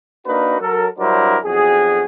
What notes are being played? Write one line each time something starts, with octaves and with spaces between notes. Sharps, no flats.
A#3 D4 D#4 F#4 A#4 B4
F#3 A4 A#4
G2 F#3 D4 E4 A#4 C5
B1 F2 F#4 G#4